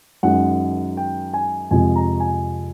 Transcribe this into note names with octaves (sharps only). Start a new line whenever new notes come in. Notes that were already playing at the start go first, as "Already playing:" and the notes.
F#2 D#3 G#3 F#5
G5
G#5
F2 C3 F3 G#3 G#5
A#5
G#5